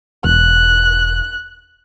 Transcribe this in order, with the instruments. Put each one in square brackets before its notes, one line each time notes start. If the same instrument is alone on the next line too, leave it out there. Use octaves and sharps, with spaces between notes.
[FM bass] E1 [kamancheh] F#6